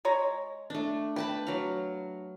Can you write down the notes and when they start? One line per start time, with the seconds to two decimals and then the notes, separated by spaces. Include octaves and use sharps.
0.05 G#3 C#5 A#5
0.70 A3 D4
1.16 B4 G5 A5 B5
1.47 F#3 F5